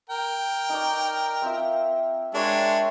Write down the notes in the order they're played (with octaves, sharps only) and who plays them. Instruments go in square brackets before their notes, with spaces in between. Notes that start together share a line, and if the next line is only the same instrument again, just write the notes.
[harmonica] A#4 G5
[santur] D#4 C#5 D5
C4 F4 E5
[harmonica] G#3 D4 C#5 [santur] A#4 E5 G5